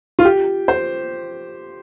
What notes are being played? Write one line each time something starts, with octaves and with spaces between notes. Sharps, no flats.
F4
G4
C5